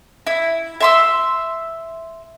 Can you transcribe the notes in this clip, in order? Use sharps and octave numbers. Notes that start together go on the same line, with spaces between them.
E4
E5 C6 E6